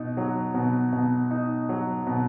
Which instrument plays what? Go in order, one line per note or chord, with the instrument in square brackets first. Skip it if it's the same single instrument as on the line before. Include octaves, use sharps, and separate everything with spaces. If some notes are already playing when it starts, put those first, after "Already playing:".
Already playing: [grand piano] B2 D#4
F#3
B2
B2
D#4
F#3
B2